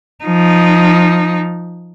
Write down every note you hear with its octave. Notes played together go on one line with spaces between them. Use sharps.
F3 D#4